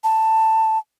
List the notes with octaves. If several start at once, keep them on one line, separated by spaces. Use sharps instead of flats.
A5